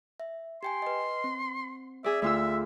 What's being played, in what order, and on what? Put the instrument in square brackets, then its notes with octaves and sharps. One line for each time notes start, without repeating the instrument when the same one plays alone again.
[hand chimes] E5
[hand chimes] G4 G5 G#5 [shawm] C6
[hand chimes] B4 D#5
C4
[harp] G#4 D5 [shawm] E5
[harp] D2 F4 E6 [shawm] E5